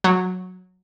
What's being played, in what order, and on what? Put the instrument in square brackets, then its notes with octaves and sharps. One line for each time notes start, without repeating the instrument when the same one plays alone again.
[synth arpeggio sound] F#3